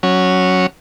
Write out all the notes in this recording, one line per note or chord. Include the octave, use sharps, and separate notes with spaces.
F#3 C#4